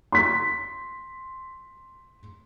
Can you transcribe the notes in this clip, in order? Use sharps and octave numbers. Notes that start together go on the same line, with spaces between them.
C6 B6